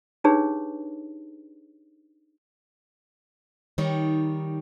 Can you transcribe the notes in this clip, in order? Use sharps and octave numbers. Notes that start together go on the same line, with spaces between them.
D4 D#4 G4 G#4 B4 C#5
D#3 G3 D#4 C#5